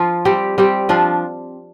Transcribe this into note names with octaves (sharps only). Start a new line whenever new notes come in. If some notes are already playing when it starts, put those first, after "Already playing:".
Already playing: F3 F4
G3 C4 G4
G3 C4 G4
F3 D4 F4